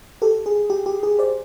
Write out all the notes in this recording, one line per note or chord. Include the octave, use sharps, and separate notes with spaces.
G4 A4
G#4
G4
G4
G#4
C5 D5